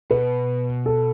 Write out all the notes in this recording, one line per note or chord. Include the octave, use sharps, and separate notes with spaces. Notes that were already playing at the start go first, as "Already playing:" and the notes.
B2 B4
A4